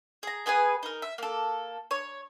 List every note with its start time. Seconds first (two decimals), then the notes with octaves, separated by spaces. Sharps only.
0.23 G#4 A#5
0.46 B3 G#4 B4 G#5
0.83 D#4 A#4
1.02 E5
1.18 A#3 A4
1.91 C#5